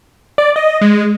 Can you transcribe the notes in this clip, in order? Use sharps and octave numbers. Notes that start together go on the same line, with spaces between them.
D5
D#5
G#3